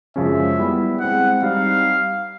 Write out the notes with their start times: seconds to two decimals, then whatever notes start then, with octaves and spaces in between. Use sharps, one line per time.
0.16 F#2 C#3 F3 G#3 C#4 E5
0.59 G3 B3 E4
1.00 G#3 C4 E4 F#5
1.43 G3 C4 D#4 F5